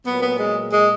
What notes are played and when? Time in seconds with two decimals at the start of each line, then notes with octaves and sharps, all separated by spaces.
0.05 A#2 F#3 B3
0.21 B3
0.39 G#3
0.71 G#3